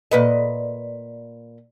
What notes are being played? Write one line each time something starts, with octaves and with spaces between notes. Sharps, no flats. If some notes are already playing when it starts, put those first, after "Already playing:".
A#2 B4 D#5